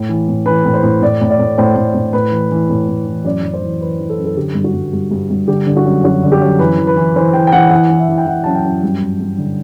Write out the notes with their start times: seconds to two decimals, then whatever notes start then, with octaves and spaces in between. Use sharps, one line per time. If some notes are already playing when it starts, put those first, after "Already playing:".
Already playing: A2
0.09 E3
0.28 A2
0.46 E3 B4
0.65 A2
0.74 C5
0.83 A2
1.02 A2 D5
1.21 A2
1.30 D5
1.39 A2
1.58 A2 C5
1.76 A2
1.94 A2
2.13 A2 B4
2.32 E3
2.51 E3
2.70 A2
2.88 A2
3.06 E3
3.25 F#2 D5
3.43 F#2
3.54 C5
3.62 E3
3.81 E3 B4
4.00 E3
4.09 A4
4.18 F#2
4.25 A4
4.37 D3 G4
4.55 G2
4.64 F#4
4.74 G2
4.93 G2
5.11 G2
5.30 G2
5.48 D3 G4
5.66 D3
5.77 F#4
5.86 F#2
6.04 F#2 F#4
6.23 D3
6.32 G4
6.42 F#2
6.59 E3 B4
6.78 E3
6.87 B4
6.97 E3
7.16 E3 C5
7.33 E3 G5
7.47 G5
7.52 E3 F#5
7.71 E3 F#5
7.90 E3
7.99 E5
8.09 E3
8.18 G5
8.26 E3 F#5
8.44 F#2 A5
8.55 G5
8.64 F#2
8.83 G2
9.02 G2
9.20 G2
9.38 D3